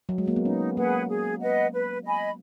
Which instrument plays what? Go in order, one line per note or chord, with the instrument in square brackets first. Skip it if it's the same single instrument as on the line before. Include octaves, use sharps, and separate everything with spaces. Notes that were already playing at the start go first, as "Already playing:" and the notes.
[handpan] F#3
G#3
A#3
B3
[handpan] C#4 [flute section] D#4
[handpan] A#3 [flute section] G#4 B4 F#5
[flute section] G#4
B4 D#5 F#5
B4
D#5 G#5 B5